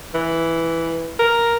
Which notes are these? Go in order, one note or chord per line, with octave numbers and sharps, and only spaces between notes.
E3
A#4